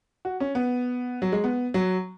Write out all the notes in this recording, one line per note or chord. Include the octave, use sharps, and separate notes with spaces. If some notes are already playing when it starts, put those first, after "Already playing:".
F#4
C#4
B3
F#3
G#3
B3
F#3